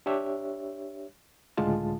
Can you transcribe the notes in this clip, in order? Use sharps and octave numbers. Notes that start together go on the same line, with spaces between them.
D4 G4 C#5 E5
C#2 A2 D3 G#3 F4 A5